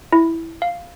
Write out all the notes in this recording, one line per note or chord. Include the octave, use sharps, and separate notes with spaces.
E4
F5